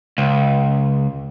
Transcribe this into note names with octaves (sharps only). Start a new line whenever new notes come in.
C#2